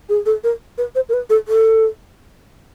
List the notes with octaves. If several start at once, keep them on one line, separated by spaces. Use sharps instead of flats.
G#4
A4
A#4
B4
C5
A#4
B4
A4
A4